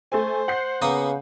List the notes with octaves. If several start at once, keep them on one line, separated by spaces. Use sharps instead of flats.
A3 A4 C5 G#5
F#5 G6 C7
C#3 A#3 B3 D#6